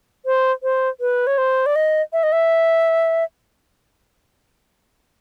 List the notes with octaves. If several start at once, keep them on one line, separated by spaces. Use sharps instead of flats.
C5
C5
B4
C#5
C5
D5
D#5
E5
D#5
E5